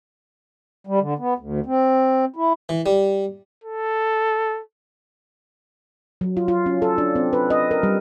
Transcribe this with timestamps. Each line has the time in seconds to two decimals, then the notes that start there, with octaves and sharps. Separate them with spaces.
0.87 G3
1.01 D3
1.19 B3
1.38 D2
1.66 C4
2.36 E4
2.69 E3
2.86 G3
3.64 A4
6.21 F#3
6.37 F4
6.48 F4
6.66 C#4
6.82 A4
6.98 D4
7.15 C4
7.33 B4
7.50 D#5
7.71 A#4
7.83 G3